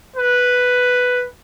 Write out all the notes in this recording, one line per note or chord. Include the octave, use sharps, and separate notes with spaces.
B4